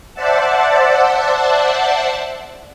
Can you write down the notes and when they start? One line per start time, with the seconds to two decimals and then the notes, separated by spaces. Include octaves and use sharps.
0.14 C5 D5 E5 F#5 A5